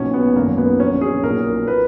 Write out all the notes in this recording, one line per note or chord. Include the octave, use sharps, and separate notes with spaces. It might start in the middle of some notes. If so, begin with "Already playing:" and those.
Already playing: B1 A#2 C#4
B3
G#1 F#2 D#3 A#3
B3
A#1 A#2 C#4
G#4
B1 A#2 A#4
A#2 B4